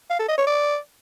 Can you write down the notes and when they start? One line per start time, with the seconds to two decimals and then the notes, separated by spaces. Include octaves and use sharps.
0.10 F5
0.20 A4
0.29 D#5
0.38 C#5
0.47 D5